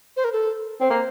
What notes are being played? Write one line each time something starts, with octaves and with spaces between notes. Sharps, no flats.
C5
A#4
A4
C4 C5 C#5
A#3